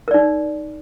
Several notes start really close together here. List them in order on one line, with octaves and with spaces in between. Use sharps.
A#4 D5 D#4